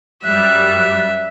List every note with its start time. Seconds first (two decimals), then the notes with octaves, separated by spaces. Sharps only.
0.24 F#2 G3 E5 F#6